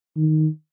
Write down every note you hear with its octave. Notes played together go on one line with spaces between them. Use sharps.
D#3